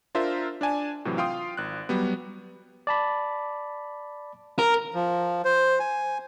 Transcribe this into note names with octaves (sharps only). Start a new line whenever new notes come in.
D4 F4 A#4 C5 E5
D4 D5 G#5 A5
A2 C3 E3 F#3
F4 F5 G5 C6 D#6
G#1 F#6
F#3 G3 B3
D5 A5 B5
A#4
F3
C5
G#5